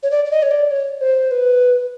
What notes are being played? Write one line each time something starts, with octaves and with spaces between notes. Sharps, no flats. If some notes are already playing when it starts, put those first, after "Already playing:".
C#5
D5
D5
D#5
C#5
D5
C#5
C5
B4